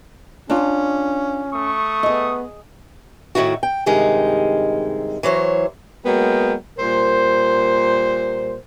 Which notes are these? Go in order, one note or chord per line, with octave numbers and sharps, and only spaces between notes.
C#4 D4 F4
A3 C#6 D#6
B3 G#4 D#5
A2 D#3 E4 F#4
G5
G2 C3 D#3 G#3
E3 F#3 C5 C#5
F#3 G#3 A#3 B3 A#4 G5
A#2 G3 A#4 C5